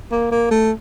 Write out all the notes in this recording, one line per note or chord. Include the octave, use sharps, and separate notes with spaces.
A#3
A#3
A3